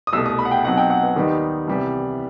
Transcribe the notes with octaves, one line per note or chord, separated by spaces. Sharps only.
D#6
C2 B2 A3 E6
D#6
B5
F#5
G5
B2 F#3 C4 D#4 F#5
G5
F#5
B4
D#2 D#3 G3 B3 D#4
C2 C3 E3 G3 B3